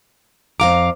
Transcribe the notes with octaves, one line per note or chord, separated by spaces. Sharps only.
F2 F5 A#5 D6